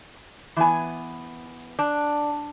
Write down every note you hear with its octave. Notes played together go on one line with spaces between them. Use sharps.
E3 B3 G#5
D4